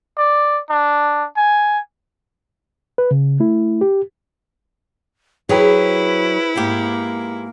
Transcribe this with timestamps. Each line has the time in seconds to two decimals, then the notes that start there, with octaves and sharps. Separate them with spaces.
0.18 D5
0.69 D4
1.36 G#5
2.98 B4
3.11 C#3
3.40 A3 E4
3.81 G4
5.49 F#3 E4 G#4 B4 C5 G5
6.56 G#2 A#3 B3 G4